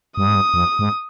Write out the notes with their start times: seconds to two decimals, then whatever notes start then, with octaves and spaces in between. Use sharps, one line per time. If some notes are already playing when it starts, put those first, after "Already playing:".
0.17 G2 D#6
0.27 G#2
0.35 G2
0.54 F2
0.79 G#2